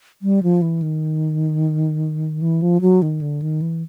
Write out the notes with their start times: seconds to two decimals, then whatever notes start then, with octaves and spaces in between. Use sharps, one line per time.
0.22 G3
0.43 F3
0.62 E3
0.82 D#3
2.41 E3
2.62 F3
2.81 F#3
3.02 D#3
3.21 D3
3.42 D#3
3.62 E3